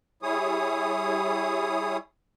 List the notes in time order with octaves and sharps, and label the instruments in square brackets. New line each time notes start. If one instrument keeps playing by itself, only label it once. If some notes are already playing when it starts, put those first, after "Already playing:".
[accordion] G3 E4 G#4 C#5 D#6